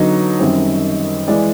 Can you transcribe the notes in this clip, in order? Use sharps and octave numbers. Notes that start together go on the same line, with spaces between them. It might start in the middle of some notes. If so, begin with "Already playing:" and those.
Already playing: D3 F#3 B3 D#4 D#5
F#2 D#3 G3 C4
E3 G#3 D5